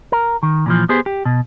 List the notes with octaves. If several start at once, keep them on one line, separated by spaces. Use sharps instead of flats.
A#4
D#3
A#2 E3 F3
B3 G4 G#4 C5
G4
B2